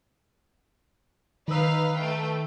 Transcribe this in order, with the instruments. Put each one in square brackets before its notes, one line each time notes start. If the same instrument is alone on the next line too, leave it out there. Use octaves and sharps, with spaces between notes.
[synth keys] D#3 E6 [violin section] D#4 B4 F5
[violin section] A3 G5